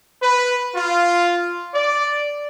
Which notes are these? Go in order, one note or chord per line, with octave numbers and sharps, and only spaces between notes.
B4
F4
D5